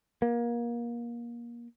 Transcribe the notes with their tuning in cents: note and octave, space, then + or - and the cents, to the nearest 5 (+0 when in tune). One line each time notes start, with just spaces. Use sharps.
A#3 +25